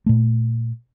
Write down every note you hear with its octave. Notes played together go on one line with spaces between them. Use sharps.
A#2 A3